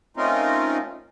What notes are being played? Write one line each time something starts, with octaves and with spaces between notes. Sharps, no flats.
A3 C4 C#4 D#4 F4 A#4